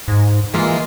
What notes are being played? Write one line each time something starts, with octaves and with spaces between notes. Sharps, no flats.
G#2
E3 G#3 A#3 F4